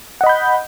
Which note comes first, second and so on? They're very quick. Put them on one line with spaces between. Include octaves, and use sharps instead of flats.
F#5 D#5 B5 G6